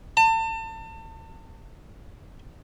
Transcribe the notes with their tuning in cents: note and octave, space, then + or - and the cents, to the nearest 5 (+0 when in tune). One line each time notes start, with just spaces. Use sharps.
A5 +35